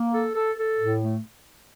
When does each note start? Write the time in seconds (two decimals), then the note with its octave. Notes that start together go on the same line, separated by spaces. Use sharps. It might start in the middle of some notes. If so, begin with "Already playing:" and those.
Already playing: A#3
0.14 A4
0.35 A4
0.58 A4
0.79 A2
1.01 A3